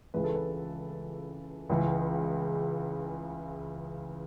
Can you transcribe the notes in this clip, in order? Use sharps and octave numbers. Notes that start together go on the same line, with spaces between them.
C#2 C#3 E3 B4
A4
B4
C#2 C#3 E3